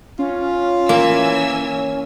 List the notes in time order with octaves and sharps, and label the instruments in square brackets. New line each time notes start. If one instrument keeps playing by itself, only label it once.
[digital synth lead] C#4 [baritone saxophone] F4
[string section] E3 G#5 E6 [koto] A#3